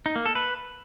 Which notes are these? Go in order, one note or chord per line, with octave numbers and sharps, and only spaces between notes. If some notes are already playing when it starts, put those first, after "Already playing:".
D#4
A#3
A4
B4